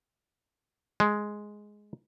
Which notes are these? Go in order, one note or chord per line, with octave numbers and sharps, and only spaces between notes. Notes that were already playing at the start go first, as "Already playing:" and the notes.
G#3